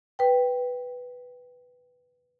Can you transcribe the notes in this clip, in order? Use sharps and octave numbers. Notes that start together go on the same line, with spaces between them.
B4 G5